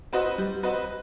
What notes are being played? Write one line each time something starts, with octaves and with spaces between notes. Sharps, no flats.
C4 F#4 B4 D#5
G3
C4 F#4 B4 D#5